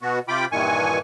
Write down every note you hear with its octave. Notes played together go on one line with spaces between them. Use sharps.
B2 B3 F#4
C3 F4 G5 B5 D6
G2 A#2 D#3 E3 G#5 C#6